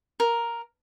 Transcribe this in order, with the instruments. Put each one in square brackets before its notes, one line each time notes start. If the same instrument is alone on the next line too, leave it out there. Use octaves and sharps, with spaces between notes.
[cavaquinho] A#4